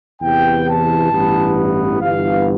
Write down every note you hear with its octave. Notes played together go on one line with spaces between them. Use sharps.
E2 C3 E3 B3 G5
A5
A1 G2 E3 B3
G1 G2 E3 B3 F5